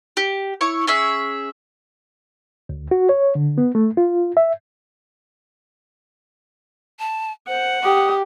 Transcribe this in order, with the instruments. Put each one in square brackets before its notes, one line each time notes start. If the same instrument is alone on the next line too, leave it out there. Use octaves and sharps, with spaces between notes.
[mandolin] G4
E4 C#5 C#6
C#4 G#4 E5
[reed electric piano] D2
F#4
C#5
D3
B3
A3
F4
E5
[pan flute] A5
[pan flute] C5 [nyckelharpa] F#5
[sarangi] G4 [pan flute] D#6